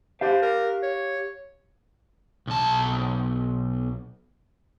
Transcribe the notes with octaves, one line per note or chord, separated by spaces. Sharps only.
G4 C5 F5
A#4
C#5
B1 A5